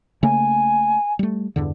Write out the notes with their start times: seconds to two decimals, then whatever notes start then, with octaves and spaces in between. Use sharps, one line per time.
0.23 C#3 A3 A#3 G#5
1.19 G3 A3
1.56 E2 G2 D3